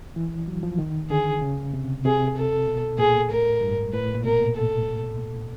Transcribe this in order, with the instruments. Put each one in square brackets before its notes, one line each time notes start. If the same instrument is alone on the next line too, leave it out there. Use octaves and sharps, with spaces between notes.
[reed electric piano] E3
F#3
F3
D#3
[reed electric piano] D3 [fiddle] G#4
[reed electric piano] C#3
C3
[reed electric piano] C3 [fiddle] G#4
[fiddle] A4
[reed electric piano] B2
[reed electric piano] A#2 [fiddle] G#4
[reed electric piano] A2 [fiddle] A#4
[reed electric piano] G2
G#2
[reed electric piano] A2 [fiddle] B4
[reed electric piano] A#2
[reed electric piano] B2 [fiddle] A#4
[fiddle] A4